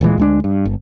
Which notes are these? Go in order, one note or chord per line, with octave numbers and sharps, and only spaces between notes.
D1 A#2 E3 G#3
D2 G#3 D4
G2
G1